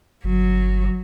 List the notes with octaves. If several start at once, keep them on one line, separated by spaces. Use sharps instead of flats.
G1 F#3